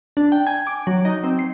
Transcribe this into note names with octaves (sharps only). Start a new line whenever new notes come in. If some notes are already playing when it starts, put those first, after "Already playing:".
D4
G5
G#5
D6
F#3
D#4
C4
C7